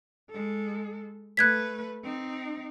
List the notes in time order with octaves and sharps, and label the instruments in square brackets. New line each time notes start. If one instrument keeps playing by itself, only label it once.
[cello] G#3 A4
[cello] A3 B4 [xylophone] F#6 G#6 B6
[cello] C4 D#4